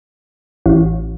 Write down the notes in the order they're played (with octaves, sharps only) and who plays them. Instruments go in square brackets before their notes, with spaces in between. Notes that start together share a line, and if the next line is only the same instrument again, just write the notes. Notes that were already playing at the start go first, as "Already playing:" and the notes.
[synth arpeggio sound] A1